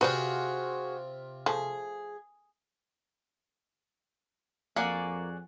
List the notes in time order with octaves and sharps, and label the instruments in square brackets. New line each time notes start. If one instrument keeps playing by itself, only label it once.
[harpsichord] C3 F4 [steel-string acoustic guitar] F#4 G#4 [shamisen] B4 C5 D5
[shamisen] F3 A3 [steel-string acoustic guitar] G#4
[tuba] F2 [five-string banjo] A#3 [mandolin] F#4 G#4 D5